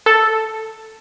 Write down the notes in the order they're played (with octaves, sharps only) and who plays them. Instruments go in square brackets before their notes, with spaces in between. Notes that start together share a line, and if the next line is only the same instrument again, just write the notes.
[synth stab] A4